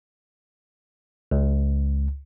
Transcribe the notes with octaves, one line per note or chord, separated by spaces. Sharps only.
C#2